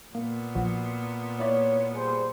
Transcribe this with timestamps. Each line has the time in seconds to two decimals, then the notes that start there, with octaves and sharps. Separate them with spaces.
0.15 A#2 A#3 B3
0.55 A#1 F3 F#4
1.39 A#3 E4 C#5 D5
1.95 G3 G#4 C5